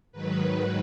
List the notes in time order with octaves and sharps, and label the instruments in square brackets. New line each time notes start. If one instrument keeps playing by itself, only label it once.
[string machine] G#2 D#3 F#3 B4